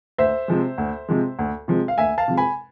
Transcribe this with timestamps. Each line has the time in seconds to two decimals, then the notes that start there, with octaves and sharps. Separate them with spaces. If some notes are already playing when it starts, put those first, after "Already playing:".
0.18 D2 C5 E5
0.48 C3 F3 G#3
0.78 D2
1.09 C3 F3 G#3
1.39 D2
1.68 C3 F3 G#3
1.88 F5
1.98 D2 E5 G#5
2.18 F5 A5
2.28 C3 F3 G#3
2.37 G#5 B5